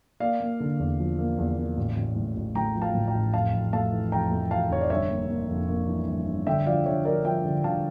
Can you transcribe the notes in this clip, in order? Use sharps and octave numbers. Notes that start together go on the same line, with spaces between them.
A#3 D5 F5
A#3
D3
E2
F3
A#3
E2
A#3
A1
A1
A2
A1
A2 G5 A#5
F3
F5 A5
A2
G5 A#5
A1
F2 F5 A5
F2
A3 F5 A5
E3
F2 G5 A#5
A3
E3 F5 A5
F1 C#5
D5
G1 C#5 E5
A#3
A#3
F2
A#3
E3
G1
G1
D3 E5 G5
F3 D5 F5
D3 C#5 E5
F3 A#4 D5
F3 E5 G5
D3
D3 F5 A5